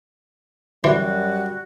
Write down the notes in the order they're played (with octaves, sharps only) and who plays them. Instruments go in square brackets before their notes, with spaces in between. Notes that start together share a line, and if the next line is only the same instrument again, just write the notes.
[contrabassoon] F#2 [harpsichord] E3 [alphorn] G3 [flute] F#4